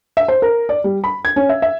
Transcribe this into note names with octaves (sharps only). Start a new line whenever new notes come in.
E5
C5
A#4
D5
G3
B5
G#6
C#4
E5
E5